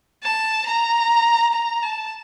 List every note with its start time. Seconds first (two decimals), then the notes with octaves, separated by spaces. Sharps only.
0.23 A5
0.67 A#5
1.53 A#5
1.83 A5